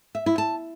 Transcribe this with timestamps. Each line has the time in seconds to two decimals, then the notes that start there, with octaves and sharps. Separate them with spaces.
0.15 E5
0.26 E4
0.38 A5